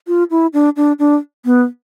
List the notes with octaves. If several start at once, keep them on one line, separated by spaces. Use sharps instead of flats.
F4
E4
D4
D4
D4
B3